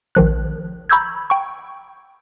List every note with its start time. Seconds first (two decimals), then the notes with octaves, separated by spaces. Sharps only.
0.15 A#1 D#3 F3 F#6
0.89 A#5 B5 C#6 E6 G6 G#6
1.30 G5 C#6